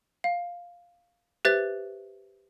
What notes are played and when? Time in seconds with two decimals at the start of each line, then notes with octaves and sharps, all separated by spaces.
0.24 F5
1.45 G4 B4 C5 E5 F#6 A6